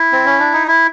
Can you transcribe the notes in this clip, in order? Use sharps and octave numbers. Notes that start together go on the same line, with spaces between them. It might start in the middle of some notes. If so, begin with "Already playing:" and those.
Already playing: E4
C4
C#4
D4
D#4
E4